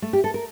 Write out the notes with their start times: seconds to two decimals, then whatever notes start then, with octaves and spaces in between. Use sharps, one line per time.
0.02 A3
0.13 G4
0.24 A4
0.34 A#4